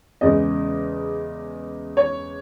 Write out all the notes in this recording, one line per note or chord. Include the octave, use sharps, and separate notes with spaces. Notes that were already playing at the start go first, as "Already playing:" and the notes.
E2 C#3 G#3 D#5
C#5